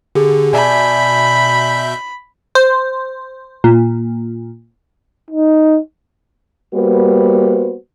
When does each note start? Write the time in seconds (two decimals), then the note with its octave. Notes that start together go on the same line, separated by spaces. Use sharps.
0.15 D3 G4 G#4
0.53 B2 D5 E5 G#5 A5 B5 G6
2.55 C5
3.64 A#2
5.30 D#4
6.73 G3 A#3 B3 F#4 B4 C5